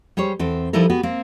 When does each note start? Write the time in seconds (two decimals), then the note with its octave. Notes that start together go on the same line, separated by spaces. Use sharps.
0.17 G3 G#4 C5 C#5
0.39 E2 C4 A4
0.73 F3 G3 D#4 E4 A4 A#4
0.90 B3 F#4 G4
1.03 A#3 C4